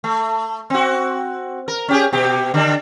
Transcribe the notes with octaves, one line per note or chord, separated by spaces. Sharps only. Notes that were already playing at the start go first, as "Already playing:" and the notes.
A3
C4 F#4
A#4
C#4 G4 G#4
B2 G4
D3 D4